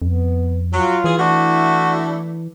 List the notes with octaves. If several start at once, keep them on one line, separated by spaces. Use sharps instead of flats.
F2 B3
F#3 F4
E3 G#4
A3 D4 E4 F#4